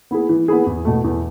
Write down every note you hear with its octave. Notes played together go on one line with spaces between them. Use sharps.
B3 E4 G#4
E3
B3 E4 G#4
E2
B2 A3
E2